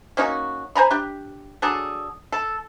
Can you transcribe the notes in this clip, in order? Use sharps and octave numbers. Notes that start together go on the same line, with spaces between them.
A#3 C#4 D#4 F#4
C5 G#5 A#5 B5
D4 G4
F#3 D4 G#4 A4
A4